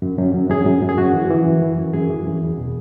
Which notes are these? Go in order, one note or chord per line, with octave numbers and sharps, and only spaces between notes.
F#2
F#2
F#2
F#2 G#4
F#2
F#2
G#4
F#2 F#4
E3
E3
F#2
E3
F#2
F#2 G#4
E3
F#2
E2
B2